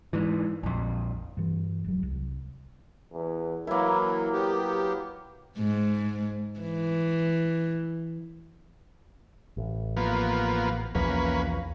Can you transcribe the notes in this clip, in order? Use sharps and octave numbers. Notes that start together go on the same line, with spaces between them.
G#2 E3
A#1 F2
G2 E3
F1 F#3
C2
E2
E3 F#3 A#3 E4 A#4
F#3 B3 G4
G#2
E3
A1
F3 A#3 B3
B1 E2 F3 A#3 C#4 B4